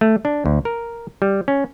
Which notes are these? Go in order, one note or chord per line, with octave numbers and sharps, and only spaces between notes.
A3
D4
D2
A#4
G3
C#4